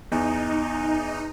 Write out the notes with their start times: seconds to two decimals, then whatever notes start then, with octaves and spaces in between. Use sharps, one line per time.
0.12 E2 D#4